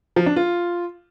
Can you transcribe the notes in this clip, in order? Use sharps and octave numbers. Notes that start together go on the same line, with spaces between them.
F3
D4
F4